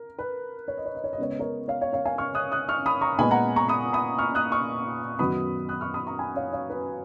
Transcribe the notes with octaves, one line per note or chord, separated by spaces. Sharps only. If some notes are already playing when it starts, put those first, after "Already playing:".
Already playing: A#4
B4
C#5
D#5
C#5
D#5
C#5
D#5
C#3 G#3 B3 C#5
D#5
A#4 C#5
C#5 F5
C#5 F5
C#5 F5
F5 G#5
C#6 F6
D#6 F#6
D#6 F#6
C#6 F6
B5 D#6
A#5 C#6
A#2 G#3 B3 G#5 B5
F#5 A#5
A#5 C#6
B5 D#6
B5 D#6
C#6 F6
D#6 F#6
C#6 F6
F#2 D#3 F#3 B3 B5 D#6
D#6 F#6
C#6 F6
B5 D#6
A#5 C#6
G#5 B5
C#5 F5
C#5 F5
B4